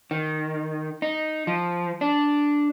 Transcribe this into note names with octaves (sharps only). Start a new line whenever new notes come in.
D#3
D#4
F3
D4